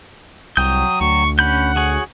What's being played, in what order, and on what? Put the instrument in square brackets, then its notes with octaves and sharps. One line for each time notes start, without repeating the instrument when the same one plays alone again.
[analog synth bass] C2 [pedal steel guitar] F#3 G5 G6 [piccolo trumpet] D#6
[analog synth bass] D2 [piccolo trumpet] C#6
[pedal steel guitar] C#4 B5 G6 [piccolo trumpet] F#5
[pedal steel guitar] F#4 G#4 C#5